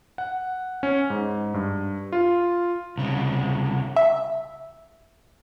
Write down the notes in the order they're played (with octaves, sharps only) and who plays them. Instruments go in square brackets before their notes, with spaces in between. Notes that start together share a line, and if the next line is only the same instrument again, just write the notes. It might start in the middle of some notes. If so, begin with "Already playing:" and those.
[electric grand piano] F#5
C#4
G#2
G2
F4
[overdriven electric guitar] C2 C#3
[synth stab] E5